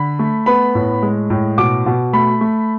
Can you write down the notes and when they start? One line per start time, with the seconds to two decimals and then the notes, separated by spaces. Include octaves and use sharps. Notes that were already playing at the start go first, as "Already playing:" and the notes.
Already playing: D3 B5
0.19 A3
0.46 B3 B5
0.75 A2
1.02 G#3
1.30 A2
1.58 B2 D6
1.86 B2
2.13 A3 B5
2.41 A3